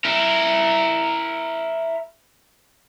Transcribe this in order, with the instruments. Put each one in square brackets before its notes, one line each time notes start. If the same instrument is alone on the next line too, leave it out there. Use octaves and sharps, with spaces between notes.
[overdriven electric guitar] E4 A#4